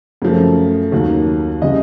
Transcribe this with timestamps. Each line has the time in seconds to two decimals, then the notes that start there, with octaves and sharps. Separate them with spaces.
0.22 F#2 C#3 F3 A3
0.92 D#2 D#3 F#3
1.62 C#3 E3 G3 D#5